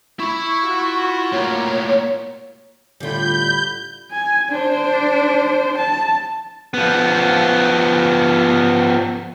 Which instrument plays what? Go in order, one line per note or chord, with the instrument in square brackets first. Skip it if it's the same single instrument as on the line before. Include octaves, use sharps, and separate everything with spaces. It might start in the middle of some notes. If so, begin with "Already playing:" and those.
[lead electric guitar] E4 B5 [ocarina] C#6
[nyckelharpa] F4 F#4
[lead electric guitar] A2 A#3 [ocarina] C#5
[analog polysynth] A2 D3 B5 [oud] G3 F4 [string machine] G6
[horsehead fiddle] G#5
D4 C5
A5
[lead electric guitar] F3 B3